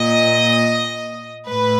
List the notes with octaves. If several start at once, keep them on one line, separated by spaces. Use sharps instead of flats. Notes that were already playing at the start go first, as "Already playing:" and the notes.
Already playing: A#2 D#5
A2 B4